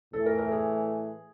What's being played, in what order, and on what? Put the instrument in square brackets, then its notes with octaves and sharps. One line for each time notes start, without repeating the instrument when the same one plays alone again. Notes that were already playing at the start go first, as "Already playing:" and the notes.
[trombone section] A2 E3 A3 [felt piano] A4
[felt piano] A#4
A#4
G#4